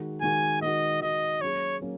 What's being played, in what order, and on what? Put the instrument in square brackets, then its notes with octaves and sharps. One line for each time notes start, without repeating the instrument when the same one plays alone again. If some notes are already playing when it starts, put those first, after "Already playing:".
Already playing: [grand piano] D#3 G#3 F#4
[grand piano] D#3 G#3 F#4 [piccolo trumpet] G#5
[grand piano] D#3 G#3 F#4 [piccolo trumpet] D#5
[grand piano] D#3 G#3 F#4 [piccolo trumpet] D#5
[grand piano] F#3 A#3 C#4 G#4 [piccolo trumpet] C#5
[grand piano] F#3 A#3 C#4